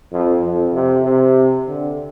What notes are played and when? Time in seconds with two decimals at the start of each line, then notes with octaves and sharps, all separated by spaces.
0.12 F2
0.42 F2
0.73 C3
1.04 C3
1.68 D3